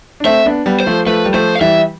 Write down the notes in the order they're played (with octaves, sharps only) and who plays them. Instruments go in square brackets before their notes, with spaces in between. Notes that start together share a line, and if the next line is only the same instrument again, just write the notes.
[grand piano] D4
[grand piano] A3 C4 [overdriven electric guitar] E5
[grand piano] B3 D4
G3 B3
[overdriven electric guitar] C5
[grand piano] F3 A3
[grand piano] F3 A3 [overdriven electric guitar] B4
[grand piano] G3
[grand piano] F3 A3 [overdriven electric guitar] C5
[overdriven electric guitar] F5
[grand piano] E3 G3 [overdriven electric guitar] E5